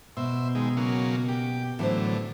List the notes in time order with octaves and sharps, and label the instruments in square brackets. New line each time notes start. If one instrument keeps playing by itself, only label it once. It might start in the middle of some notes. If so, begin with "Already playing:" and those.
[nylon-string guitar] B2 [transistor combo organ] C5 E5
[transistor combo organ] D#3 G#3
C#3 F#3 A#3
G4
[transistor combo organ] A2 D3 [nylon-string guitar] E3 F#3 C5